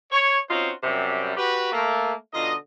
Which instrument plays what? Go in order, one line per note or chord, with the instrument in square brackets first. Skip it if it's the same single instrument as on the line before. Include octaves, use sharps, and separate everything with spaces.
[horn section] C#5
C4 C#4 D#4 F4 F#4 C5
F#2 C3 G3
F#4 G4 B4
A3 A#3
B2 D3 D#4 F4 D#5